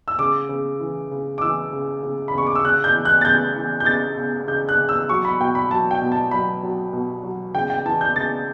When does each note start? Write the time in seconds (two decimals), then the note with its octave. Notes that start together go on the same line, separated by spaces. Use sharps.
0.08 E6
0.19 C#3 D6
0.49 C#3
0.80 E3
1.11 C#3
1.38 D6
1.41 E3 E6
1.73 C#3
2.03 C#3
2.28 B5
2.33 C#3 C#6
2.47 D6
2.55 E6
2.65 C#3 F#6
2.84 G6
2.94 E3
3.05 F#6
3.21 A6
3.25 C#3 G6
3.56 E3
3.80 G6
3.86 C#3 A6
4.17 C#3
4.47 C#3 G6
4.69 F#6
4.79 C#3
4.89 E6
5.09 F#3 C#6
5.25 B5
5.40 B2 G5
5.55 B5
5.71 F#3 A5
5.91 G5
6.02 B2
6.12 A5
6.31 F#3 B5
6.63 F#3
6.93 B2
7.23 F#3
7.54 C#3 G5
7.70 G5
7.86 E3 A5
8.01 G6
8.16 C#3 A6